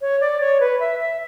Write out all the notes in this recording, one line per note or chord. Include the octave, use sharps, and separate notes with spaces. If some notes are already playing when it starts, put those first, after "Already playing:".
C#5
D5
C#5
B4
E5
E5